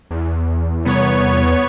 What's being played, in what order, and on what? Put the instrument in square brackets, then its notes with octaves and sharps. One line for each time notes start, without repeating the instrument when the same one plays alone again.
[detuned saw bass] E2
[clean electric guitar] C2 [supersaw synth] B3 C#5